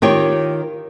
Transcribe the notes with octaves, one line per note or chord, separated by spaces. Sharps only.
D#3 F4 G4 C#5